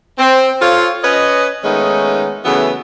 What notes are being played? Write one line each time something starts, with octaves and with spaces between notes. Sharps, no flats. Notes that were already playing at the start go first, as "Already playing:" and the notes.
C4
F4 A4 C5 C#5 F5
C#4 B4 C#5 D#5
D#3 G#3 A3 B3 C#4 D#4
C#3 E3 F#3 A3 B3